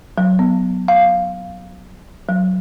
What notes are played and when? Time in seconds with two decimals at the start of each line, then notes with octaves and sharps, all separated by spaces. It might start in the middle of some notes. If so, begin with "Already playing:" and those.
0.18 F#3
0.39 B3
0.88 F5
2.29 F#3